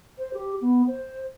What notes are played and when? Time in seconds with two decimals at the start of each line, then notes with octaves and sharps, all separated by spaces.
0.18 C5
0.33 G4
0.61 B3
0.87 C5